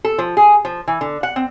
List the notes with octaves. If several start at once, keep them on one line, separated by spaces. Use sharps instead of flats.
A4
F3
G#4
F3
E3
D3
F#5
C4